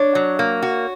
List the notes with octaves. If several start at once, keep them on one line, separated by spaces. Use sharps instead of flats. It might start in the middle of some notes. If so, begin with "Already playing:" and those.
Already playing: D4 C#5
F#3
A#3
F#4